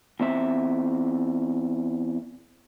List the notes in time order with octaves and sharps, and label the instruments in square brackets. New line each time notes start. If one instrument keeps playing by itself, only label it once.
[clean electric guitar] E2 C4 E5